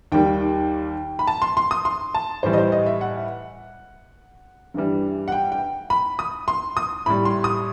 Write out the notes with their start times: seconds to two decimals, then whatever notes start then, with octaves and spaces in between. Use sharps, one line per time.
0.12 D#2 D#3 G3 G5
1.19 B5
1.27 A5
1.42 C6
1.57 C6
1.71 D#6
1.85 C6
2.15 A5
2.43 A2 E3 G3 C5
2.53 D#5
2.58 C5
2.72 D#5
2.86 E5
3.01 F#5
4.74 G2 E3 G3
5.28 F#5
5.32 G5
5.52 G5
5.90 B5
6.19 D#6
6.48 C6
6.77 D#6
7.06 A2 G3 B5
7.25 C6
7.44 D#6